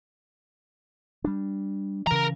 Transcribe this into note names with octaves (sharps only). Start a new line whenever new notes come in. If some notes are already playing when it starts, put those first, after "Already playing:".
G3 D4
C#3 E3 A#4 A#5